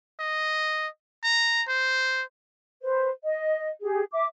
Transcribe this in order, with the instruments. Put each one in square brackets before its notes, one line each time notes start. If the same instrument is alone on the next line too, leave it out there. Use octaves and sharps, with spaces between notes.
[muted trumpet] D#5
A#5
C5
[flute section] B4 C5
D#5
G4 G#4
E5 D6